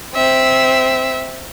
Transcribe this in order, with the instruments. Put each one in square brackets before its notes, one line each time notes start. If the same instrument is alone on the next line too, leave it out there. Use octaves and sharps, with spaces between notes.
[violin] C4 E5